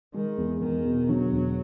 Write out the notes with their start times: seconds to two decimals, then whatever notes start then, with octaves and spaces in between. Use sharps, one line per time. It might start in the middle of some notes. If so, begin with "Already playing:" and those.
0.14 D#3 G#3
0.37 E2
0.61 E2 D#3
0.85 B2
1.09 D3 F#3
1.32 E1